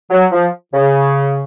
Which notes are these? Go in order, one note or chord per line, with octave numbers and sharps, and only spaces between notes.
F#3
F3
C#3